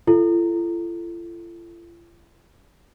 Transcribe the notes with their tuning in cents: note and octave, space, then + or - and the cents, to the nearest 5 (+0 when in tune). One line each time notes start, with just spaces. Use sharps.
F4 -45 A4 +0